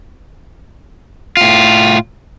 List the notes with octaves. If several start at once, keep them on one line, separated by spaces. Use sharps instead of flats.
A2 F4